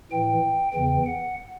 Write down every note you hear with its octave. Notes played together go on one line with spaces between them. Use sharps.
A2 E3 G5
E2 C#3 E3 G5
F#5